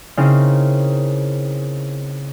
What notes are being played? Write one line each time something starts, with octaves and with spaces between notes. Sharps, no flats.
C#3 C4 C#4 D#4 E4 A#4